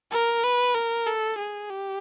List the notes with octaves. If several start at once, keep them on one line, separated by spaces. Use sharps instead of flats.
A#4
B4
A#4
A4
G#4
G4